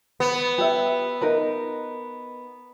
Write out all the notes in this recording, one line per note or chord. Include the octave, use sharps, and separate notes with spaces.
B3
G4 E5
D#4 A#4 B4